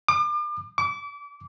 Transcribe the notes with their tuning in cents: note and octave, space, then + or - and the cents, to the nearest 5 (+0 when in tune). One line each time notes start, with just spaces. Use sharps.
D6 +40
D6 -30